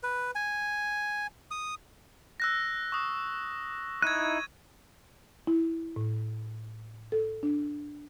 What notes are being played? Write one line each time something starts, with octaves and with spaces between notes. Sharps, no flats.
B4
G#5
D#6
E6 F#6 A#6
C#6 D#6
D#4 E4 F#6 G#6 D#7
E4
A2
A4
D4